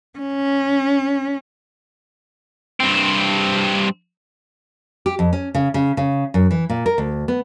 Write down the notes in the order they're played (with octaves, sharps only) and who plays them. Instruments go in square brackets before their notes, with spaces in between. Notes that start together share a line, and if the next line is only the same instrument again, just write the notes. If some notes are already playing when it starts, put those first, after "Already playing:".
[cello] C#4
[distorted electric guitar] G2 C4
[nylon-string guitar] G4
F2
C#4
C#3
C#3
C#3
F#2
E3
A#2
A#4
D2
B3